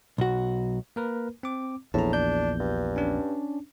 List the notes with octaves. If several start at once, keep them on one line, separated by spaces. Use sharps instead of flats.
B1 F#4
A#3 A#4 B4
C4 D6
A#1 E2 A2 A5 A#5
D4 G6
G2
C#4 D4